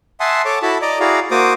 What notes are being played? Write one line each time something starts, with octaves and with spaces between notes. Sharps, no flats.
E5 F#5 G#5 A5 C6 D#6
A4 C#5 A5 D6
E4 F#4 A4 A5 B5
D5 D#5 A#5 D6
E4 F#4 G#4 D5 F5 A#5
A#3 F#4 C5 D6 D#6